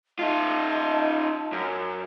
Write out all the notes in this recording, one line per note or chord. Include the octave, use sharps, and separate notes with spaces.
D#4 F4 D#5 A5
F#2